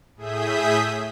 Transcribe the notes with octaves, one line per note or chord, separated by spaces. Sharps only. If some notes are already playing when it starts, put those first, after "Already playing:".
A2 G#4 E5 D#6 G6 B6